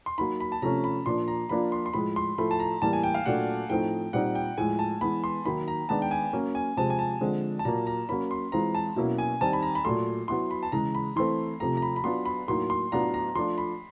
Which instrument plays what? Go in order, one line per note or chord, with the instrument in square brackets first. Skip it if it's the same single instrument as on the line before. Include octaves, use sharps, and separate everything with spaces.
[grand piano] C6
[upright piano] F#3 A#3 D#4 [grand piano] B5
[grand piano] B5
A5
[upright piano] C3 F3 A3 C#4 [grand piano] A#5
[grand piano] B5
[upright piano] A#2 F3 A#3 D4 [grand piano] C6
[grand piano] A#5
[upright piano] F3 A#3 D4 F4 [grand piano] B5
[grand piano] C6
C6
[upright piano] A2 F3 G#3 [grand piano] B5
[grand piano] C6
[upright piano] A2 F3 A3 [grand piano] B5
[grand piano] A5
A#5
[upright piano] A2 E3 G3 A#3 [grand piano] A5
[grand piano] G#5
G5
F5
[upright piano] A#2 F#3 A3 D4 [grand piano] F#5
[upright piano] A2 F3 A3 C4 D#4 [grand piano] G5
[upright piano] A#2 G3 C4 D#4 [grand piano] F#5
[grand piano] G5
[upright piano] A2 F3 G#3 [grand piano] G#5
[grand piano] A5
[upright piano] E3 G#3 B3 [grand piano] B5
[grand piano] C6
[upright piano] D#3 F#3 A#3 D#4 [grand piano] B5
[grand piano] A#5
[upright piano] D#3 G#3 B3 D4 [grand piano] A5
[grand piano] G5
G#5
[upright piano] F#3 A#3 C#4
[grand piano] G#5
[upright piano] C3 F3 G#3 C4 [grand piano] A5
[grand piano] G#5
A5
[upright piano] D3 F3 G#3 C4
[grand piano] A5
[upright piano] A#2 F#3 A#3 [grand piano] A#5
[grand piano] A#5
[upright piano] F#3 A#3 C#4 [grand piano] B5
[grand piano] C6
[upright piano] E3 G#3 C4 F4 [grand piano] A#5
[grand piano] A5
[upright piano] B2 F#3 A#3 C#4 E4
[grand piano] G#5
[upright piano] D#3 G3 C4 D#4 [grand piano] A5
[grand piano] B5
A#5
B5
[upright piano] A#2 F#3 A3 [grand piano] C6
[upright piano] F#3 B3 E4 [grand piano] C6
[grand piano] B5
A5
[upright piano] C#3 E3 G#3 [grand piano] A#5
[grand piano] B5
[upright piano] E3 A3 C4 [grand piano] C6
[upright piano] C3 F3 A3 [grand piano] A#5
[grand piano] A#5
B5
B5
[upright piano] F#3 B3 D4 F4 [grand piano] C6
[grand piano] B5
[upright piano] A2 F#3 A#3 D#4 [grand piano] C6
[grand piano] C6
[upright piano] A2 F#3 B3 D4 F4 [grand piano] A#5
[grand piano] A#5
[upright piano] F3 A3 D4 F4 [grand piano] C6
[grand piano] B5